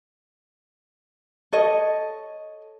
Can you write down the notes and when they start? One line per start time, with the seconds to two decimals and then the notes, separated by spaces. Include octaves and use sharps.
1.53 A4 C#5 D#5